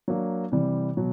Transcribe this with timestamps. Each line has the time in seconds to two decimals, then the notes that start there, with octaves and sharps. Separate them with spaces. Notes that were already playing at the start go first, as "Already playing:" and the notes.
0.08 F#3 A#3 D4
0.52 C3 E3 G3
0.97 B2 F#3